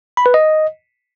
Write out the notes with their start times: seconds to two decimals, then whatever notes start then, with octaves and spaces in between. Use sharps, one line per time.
0.17 B5
0.26 B4
0.34 D#5